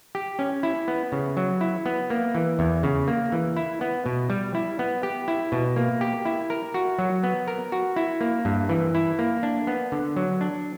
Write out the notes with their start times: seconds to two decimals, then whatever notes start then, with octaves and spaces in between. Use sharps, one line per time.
0.15 G4
0.39 C#4
0.63 E4
0.88 B3
1.12 C#3
1.37 F#3
1.61 E4
1.86 B3
2.10 A#3
2.35 E3
2.59 E2
2.83 C#3
3.08 A#3
3.32 E3
3.56 E4
3.81 B3
4.06 B2
4.30 G3
4.55 E4
4.79 B3
5.03 G4
5.28 E4
5.52 B2
5.76 A#3
6.01 G4
6.25 E4
6.50 A#4
6.74 F#4
6.99 F#3
7.23 B3
7.48 A#4
7.72 F#4
7.96 E4
8.21 A#3
8.45 G2
8.69 E3
8.95 E4
9.19 A#3
9.43 D4
9.67 B3
9.92 D3
10.16 F#3
10.41 D4